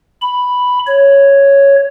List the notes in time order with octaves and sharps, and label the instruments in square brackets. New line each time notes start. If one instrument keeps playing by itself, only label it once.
[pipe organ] B5
C#5